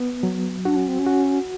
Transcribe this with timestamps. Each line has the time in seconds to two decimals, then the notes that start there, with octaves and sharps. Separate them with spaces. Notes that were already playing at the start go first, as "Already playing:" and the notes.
Already playing: B3
0.23 F#3
0.65 D4 F#4
0.76 C#4
0.88 C4
0.99 C#4
1.06 F#4